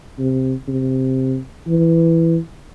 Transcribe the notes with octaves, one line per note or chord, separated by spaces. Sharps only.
C3
C3
E3